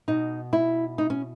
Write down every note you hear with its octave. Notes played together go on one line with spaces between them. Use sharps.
B2 D#4
E4
D#4
C#4